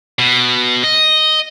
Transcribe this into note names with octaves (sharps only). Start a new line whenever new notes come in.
B2
D#5